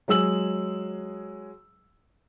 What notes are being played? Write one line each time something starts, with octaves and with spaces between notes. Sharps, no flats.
F#3 G#3 G#4 E6 F#7